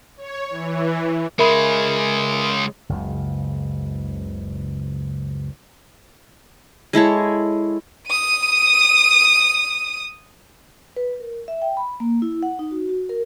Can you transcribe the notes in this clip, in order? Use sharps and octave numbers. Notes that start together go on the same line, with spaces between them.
C#5
E3
C#3 G#3 A#4 E5 B5
F#1 C#2
G#3 E4 A4 C#5
D#6 D#7
B4
A#4
E5
G5
B5
A#3
E4
F#5
D#4
F#4
F#4
A#4